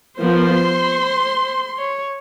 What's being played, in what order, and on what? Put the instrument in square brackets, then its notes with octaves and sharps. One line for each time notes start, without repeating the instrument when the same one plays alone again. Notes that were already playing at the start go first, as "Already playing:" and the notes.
[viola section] F3 B3 A#4 [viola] C5
[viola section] C6
[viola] C#5